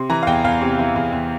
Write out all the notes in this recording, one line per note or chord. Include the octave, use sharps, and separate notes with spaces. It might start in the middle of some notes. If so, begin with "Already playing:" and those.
Already playing: C3 C6
E3 A#5
F5
E2 G5
E2 F5
C3
E3
E2
E2